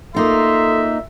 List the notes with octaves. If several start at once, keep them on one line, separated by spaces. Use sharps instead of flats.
A#3 D#4 F4 A4 E5 C6 D#6